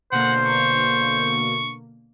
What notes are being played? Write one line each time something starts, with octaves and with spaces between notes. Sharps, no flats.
B2 D3 A#3 C5 F#5
C#6